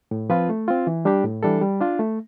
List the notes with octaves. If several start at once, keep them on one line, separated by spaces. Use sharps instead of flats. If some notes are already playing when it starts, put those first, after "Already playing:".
A2
F3 C4 F4 B4
A3
C4 F4
E3
G3 D4 G4
A2
E3 G3 D4 A4
G3
D4 F4
A3